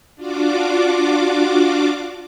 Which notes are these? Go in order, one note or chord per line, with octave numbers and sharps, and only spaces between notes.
D4 F4 F#4 D6